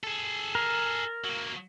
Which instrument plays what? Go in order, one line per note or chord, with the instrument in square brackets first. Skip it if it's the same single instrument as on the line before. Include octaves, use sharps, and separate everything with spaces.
[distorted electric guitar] G#4 A4
[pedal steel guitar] A#4
[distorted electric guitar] F#3 A#3